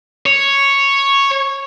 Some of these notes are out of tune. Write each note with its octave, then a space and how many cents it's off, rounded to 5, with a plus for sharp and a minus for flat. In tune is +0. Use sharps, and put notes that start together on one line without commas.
C#5 +0